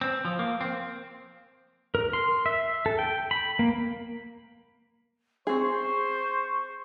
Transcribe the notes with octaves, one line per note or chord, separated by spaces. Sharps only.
C4
F3
A#3
C4
A#4
C6
E5
A4
G5
B5
A#3
C4 G#4 C5 C#6